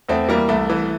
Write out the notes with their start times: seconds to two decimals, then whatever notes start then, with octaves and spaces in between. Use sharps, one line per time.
0.09 E2 A3 C4
0.29 E3 G3 A#3
0.48 C2 A3
0.69 E3